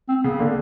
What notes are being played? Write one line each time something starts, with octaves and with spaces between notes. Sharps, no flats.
C4
C#3 B3
D3 A#3